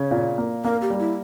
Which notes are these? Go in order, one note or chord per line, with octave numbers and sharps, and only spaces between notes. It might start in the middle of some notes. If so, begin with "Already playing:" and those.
Already playing: C#3 C#5
A#2
A#3
A#3 A#4
G4
G3
E4